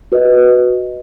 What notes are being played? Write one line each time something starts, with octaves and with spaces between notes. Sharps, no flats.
F#4 B4 D#5